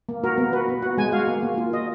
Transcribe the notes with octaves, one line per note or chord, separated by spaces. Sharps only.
A#3
F#4 A#4
B3
F#4 B4
B3
F#4 F#5
G#3 G#5
F#4 F5
A#3
A#3
F4
F#4 D#5